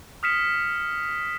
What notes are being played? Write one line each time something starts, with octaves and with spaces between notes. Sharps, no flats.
D#6 F6 B6 C#7 E7